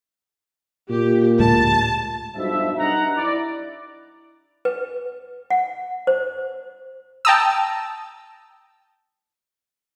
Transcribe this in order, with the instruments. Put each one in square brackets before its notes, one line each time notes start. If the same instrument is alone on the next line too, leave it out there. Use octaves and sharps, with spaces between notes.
[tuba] A#2 [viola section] G4
[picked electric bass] D2 A2 G#3 [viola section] A5
[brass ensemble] B1 G2 B2 F3 E5
G2 D#4 F#5 A#5
E4 D5
[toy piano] B4
F#5
C5
[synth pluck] G5 A5 A#5 D#6 E6